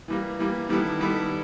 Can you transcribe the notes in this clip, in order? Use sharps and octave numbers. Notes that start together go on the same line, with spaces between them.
E3 G3 A#3
E3 G3 A#3
D#3 G3 B3 E4 A4
D#3 G3 B3 E4 A4